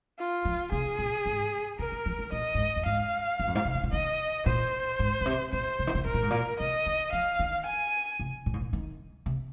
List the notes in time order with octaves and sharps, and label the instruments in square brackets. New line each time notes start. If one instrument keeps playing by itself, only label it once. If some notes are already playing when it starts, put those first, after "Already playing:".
[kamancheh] F4
[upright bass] F3
[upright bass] C3 [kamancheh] G#4
[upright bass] A#2
G#2
[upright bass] C3 [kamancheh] A#4
[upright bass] D#3
F3
D#3
[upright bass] A#2 [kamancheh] D#5
[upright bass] G#2
F2
F2
[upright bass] G#2 [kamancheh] F5
[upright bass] G#2
F2
G#2
C3
D#3
C3
[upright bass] D#3 [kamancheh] D#5
[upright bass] A#2 [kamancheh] C5
[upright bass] G#2
A#2
C3
[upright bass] A#2 [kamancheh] C5
[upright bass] C3
D#3
C3
[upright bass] C3 [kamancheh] A#4
[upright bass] A#2
G#2
A#2
[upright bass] C3 [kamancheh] D#5
[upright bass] D#3
[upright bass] F3 [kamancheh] F5
[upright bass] D#3
[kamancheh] G#5
[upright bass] C3
A#2
G#2
A#2
D#3
C3